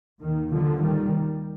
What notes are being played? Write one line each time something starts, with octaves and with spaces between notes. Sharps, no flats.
D#2 D#3
D3 F3
D#3 G3